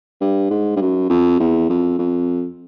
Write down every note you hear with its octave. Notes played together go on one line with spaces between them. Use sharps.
G2
G#2
G2
F#2
F2
E2
F2
F2